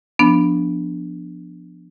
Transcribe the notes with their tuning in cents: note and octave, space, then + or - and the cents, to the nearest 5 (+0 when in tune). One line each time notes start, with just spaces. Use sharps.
F3 +0 B3 -5 D4 +0